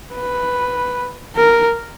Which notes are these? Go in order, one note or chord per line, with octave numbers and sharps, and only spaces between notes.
B4
A#4